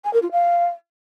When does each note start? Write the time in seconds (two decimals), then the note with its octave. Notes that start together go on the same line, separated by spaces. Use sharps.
0.04 G#5
0.13 A#4
0.22 F4
0.31 F5